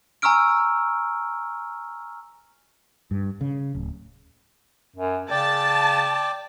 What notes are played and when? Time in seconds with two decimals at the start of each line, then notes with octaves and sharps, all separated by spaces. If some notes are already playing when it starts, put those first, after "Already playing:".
0.22 G#5 A#5 C#6 E6 F6 D7
3.11 G2
3.41 C#3
3.74 D1
4.96 F#2
5.31 C#3 D5 G5 A5